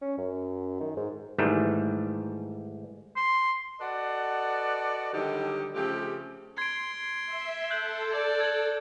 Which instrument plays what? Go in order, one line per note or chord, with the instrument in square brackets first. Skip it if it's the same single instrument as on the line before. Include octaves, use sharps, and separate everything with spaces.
[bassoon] C#4
F#2
D#3
G#2
[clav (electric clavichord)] G#2 D#3 E3 G3 A3
[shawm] C6
[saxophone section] F#4 A4 B4 D5 D#5 F#5
D3 D#3 F#3 G3 D#4 G4
C#3 F3 A3 C4 G4
[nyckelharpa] C6 [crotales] G#6 D7
[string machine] E5
[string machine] A4 [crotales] F#6 G6 F#7
[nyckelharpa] D5 [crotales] G#6
[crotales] G#6 F#7